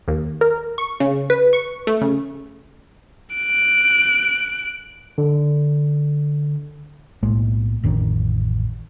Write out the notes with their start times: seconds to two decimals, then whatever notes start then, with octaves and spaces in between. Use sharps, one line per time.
0.08 D#2
0.41 A#4
0.78 C#6
1.00 C#3
1.30 B4
1.53 C#6
1.87 A3
2.02 C#3
3.35 F#6 D7
5.18 D3
7.23 B1 A2 G#3 A#3
7.84 A1 F2 D#3 D4